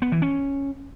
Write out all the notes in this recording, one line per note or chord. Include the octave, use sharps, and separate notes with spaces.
B3
E3
C#4